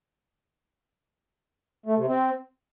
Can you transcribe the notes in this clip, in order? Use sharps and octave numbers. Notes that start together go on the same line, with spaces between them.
A3
C3
C4